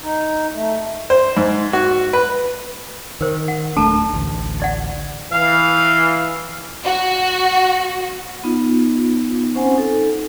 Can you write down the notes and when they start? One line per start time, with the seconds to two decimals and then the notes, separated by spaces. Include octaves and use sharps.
0.02 D#4
0.53 A3
1.10 C5
1.37 G#2
1.73 F#4
2.13 B4
3.21 D#3 A#4 C5
3.48 F#5
3.77 D1 A3 D4 A4 A5 A#5
4.13 A1 D2
4.60 E4 D5 F#5
5.32 E3 F5
6.85 F#4
8.44 B3 D#4 F4
9.54 C4 C#4 C5 F#5 G#5
9.76 D#4 A4